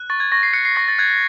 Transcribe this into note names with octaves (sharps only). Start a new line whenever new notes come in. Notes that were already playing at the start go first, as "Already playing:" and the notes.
Already playing: F#6
C#6 A6
G#6
C#6 A#6
C7
F#6 C#7
C7
C#6 A#6
A6
F#6 G#6